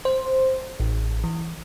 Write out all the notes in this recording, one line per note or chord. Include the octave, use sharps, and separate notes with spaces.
C5
A1
E3